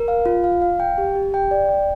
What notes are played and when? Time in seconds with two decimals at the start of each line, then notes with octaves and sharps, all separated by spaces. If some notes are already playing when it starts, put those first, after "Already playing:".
Already playing: A#4
0.08 F5
0.26 F4
0.44 F5
0.62 F5
0.80 G5
0.98 G4
1.15 G4
1.34 G5
1.51 D5
1.69 G5